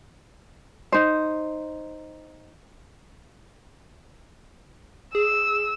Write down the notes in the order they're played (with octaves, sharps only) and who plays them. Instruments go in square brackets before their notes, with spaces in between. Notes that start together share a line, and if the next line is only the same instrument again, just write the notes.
[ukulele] D#4 C5
[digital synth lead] G#4 [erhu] E6